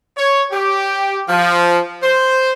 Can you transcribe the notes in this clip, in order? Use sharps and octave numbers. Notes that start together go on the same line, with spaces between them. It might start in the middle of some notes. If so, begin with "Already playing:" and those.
C#5
G4
F3
C5